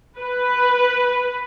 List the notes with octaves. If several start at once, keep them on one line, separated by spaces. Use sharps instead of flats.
B4